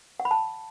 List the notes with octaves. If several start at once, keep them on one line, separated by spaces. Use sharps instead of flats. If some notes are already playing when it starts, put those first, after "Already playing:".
F#5
B5
A5